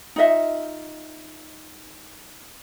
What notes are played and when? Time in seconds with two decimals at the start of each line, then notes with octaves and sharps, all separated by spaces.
0.16 D#4 F4 D#5 E5